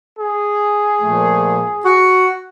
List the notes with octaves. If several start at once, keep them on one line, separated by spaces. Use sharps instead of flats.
G#4
A#2 F3 A3
F#4